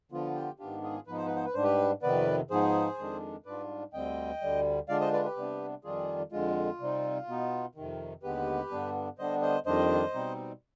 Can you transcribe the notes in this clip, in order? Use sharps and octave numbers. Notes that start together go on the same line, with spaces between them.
D3 F3 B3 F4
G4
G#2 D#3 B3 D4 F4 G4
F4 G#4
G#2 F3 B3 D#4 B4
C5
B4
C5
B4
G#2 G3 D4 C5
G4 B4
F2 C3 D#3 B3 B4 D5
G#2 F3 B3 D#4 G#4 C5
F2 D#3 G#3 D4
G#2 G3 D4 F4 B4 D5
D2 D3 G3 C4 D#5 G5
D2 D3 G3
D3 G#3 D4 F4 D5 F5
C5 D#5
B4 D5
G4 B4
C3 G3 B3 D4
F2 D#3 G3 D4 F4 G#4
F2 D3 G#3 F4
C3 G3 C4 D#4
B2 B3 D#4
F2 C3 D#3
D#2 D3 G#3 B3 G4 B4
G2 D3 G3 B3 D4
D3 G3 B3 D4 C5 D#5
C5 D#5
F2 D#3 G3 D4 C5 D#5
B2 G3 C4 D#4